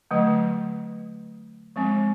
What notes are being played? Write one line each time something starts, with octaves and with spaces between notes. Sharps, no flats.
D3 F#3 A3
F3 G#3 C4